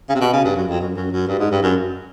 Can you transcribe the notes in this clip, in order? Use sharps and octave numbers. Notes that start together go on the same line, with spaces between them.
C#3
C3
B2
C#3
G2
F#2
F2
F#2
F#2
F#2
G2
G#2
G2
F#2